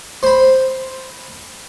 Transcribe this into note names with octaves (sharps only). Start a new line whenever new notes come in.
C5 B5